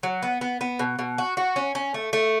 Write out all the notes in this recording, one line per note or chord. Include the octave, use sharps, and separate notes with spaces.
F#3
B3
B3
B3
B2
B2
F#4
F#4
C#4
C#4
A3
A3